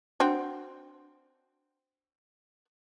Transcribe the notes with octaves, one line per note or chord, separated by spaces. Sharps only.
C4 D4 F#4